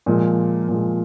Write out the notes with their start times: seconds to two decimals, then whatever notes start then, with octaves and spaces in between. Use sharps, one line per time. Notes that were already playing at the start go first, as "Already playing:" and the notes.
0.06 A#2 F3 G#3
0.68 A#2 F3 G#3